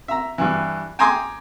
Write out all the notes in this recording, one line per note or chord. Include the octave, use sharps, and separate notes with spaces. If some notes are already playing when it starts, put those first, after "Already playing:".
E5 A#5
G2 E3
G5 G#5 A#5 C6 D6 D#6